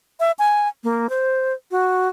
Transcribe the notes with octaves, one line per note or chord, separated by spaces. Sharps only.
E5
G#5
A#3
C5
F#4